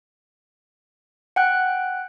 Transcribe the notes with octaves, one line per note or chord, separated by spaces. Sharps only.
F#5 G5 F#6